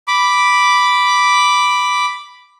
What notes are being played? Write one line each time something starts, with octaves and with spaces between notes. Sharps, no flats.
B5 D6